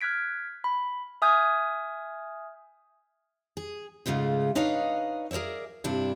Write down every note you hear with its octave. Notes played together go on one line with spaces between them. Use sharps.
F6 F#6 G#6 B6 D7
B5
E5 G#5 D#6 F6 G6 G#6
G#4
G#2 C#3 G#3 A3 F4
D4 D#4 B4 C#5 D#5 F5
G#4 A#4 C#5 D5 E5
G2 C3 D4 E4